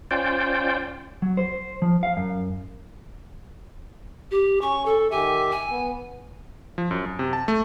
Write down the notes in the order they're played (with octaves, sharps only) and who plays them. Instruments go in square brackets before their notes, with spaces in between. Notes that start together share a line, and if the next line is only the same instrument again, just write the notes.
[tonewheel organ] C#4 F4 C5 D5 G5
[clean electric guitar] F#3
C5
F3
F5
F#2
[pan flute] G4
[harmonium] C#4 [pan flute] C#6
[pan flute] A4
[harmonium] D#3 G4 E5 [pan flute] G#5
[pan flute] G#5
[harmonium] B3
[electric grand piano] F3
F#2
F#2
C3
A5
A3